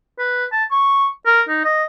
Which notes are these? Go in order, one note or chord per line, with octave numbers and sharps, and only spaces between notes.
B4
A5
C#6
A#4
D#4
D#5